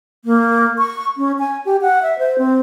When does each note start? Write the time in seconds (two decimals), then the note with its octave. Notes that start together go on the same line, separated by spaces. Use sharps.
0.25 A#3
0.78 C#6
1.18 C#4
1.39 G#5
1.65 G4
1.82 F#5
2.02 E5
2.19 C5
2.38 C4